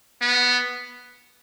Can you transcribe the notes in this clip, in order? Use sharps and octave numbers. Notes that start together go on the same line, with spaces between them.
B3